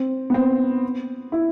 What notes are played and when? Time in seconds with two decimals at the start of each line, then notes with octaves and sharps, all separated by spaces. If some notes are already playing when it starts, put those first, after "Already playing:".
Already playing: C4
0.30 B3
0.34 C4
1.32 E4